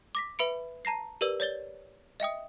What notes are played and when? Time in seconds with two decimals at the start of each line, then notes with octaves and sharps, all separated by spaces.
0.15 D6 A#6 B6
0.39 B4 E5 B5 C#7 D7
0.85 A5 A#5 A#6 C7
1.21 G4 A#4 B4 D5 E6
1.40 C#5 D5 A6 G7
2.20 D#5 E5 G5 D#6